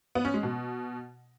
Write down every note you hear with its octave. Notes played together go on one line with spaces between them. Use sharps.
B3
C#4
G#3
B2